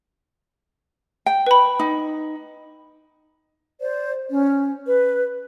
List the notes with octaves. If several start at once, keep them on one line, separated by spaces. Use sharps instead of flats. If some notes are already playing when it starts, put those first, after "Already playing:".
G5
B4 B5
D#4
C5 D5
C#4
B4